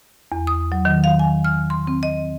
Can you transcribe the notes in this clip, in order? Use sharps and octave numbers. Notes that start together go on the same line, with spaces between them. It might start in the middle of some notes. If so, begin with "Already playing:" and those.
E2
D#6
F#3
D#3
F5
G#5
F6
C6
C4
D#5